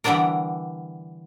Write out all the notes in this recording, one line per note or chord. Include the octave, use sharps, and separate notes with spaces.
D3 E3 G3 B3 D4 A#4